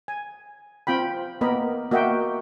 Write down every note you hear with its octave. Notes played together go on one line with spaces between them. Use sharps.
G#5
C4 F4 G5 B5
A#3 B3 A#4 D#5 B5
A#3 F#4 D#5 E5 F#5 G5